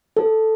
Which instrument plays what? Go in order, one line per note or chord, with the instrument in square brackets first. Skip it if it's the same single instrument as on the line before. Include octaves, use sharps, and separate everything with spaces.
[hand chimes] A4